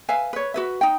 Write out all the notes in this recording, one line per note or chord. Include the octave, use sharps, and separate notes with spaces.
B4 E5 F5 G#5
B4 C#5
F#4 B4 E5
D#4 G5